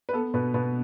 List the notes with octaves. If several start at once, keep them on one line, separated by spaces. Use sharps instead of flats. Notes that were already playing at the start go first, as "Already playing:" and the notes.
B4
B3 A4
B2 B4
B2 B4